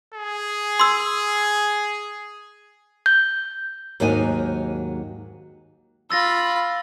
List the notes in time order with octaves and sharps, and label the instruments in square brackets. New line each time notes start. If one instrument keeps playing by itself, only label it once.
[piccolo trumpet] G#4
[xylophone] C6 E6
[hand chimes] G6
[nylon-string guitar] D#2 G#2 F#3 A#3 D#4 G#5
[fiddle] F4 B5 [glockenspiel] E6 A6 A#6